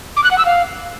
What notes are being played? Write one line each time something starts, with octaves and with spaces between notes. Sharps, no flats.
D6
F#6
F#5
E6
F5